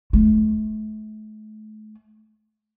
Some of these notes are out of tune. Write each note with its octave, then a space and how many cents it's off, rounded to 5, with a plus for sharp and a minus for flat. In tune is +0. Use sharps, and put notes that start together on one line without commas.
A3 -35